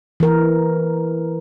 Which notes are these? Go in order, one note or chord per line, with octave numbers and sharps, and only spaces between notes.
E3 A#4